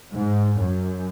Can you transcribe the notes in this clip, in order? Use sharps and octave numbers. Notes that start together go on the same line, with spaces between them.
G#2
F#2